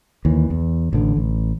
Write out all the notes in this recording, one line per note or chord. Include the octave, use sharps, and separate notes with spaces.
D#2 E3
E2
A1 D3
A1